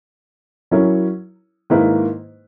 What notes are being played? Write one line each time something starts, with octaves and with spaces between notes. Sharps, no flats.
F#3 C#4 E4 A#4 C#5
G#2 D#3 A#3 E4 B4